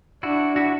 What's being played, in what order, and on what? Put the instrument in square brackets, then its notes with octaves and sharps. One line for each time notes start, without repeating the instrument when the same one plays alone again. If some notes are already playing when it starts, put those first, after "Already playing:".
[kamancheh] D4 [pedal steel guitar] E4 F#4
[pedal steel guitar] E4 F#4